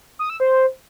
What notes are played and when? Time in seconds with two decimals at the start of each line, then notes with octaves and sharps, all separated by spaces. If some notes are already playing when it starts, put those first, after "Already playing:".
0.19 D#6
0.30 E6
0.40 C5